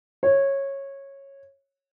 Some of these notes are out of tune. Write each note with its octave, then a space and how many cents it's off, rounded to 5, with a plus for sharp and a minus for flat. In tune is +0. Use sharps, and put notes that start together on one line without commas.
C#5 -15